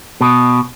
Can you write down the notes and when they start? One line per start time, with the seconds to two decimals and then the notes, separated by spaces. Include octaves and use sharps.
0.21 B2